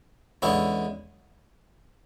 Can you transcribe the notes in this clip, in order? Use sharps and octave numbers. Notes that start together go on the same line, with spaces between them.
E2 D3 G#3 C#4 E4